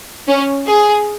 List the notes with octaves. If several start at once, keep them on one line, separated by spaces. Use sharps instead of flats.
C#4
G#4